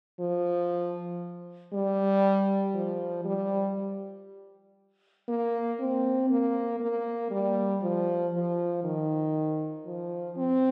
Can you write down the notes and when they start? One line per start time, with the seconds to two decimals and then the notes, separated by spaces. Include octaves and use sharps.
0.20 F3
1.73 G3
2.74 F3
3.25 G3
5.28 A#3
5.80 C4
6.30 A#3
6.80 A#3
7.31 G3
7.82 F3
8.34 F3
8.84 D#3
9.86 F3
10.37 C4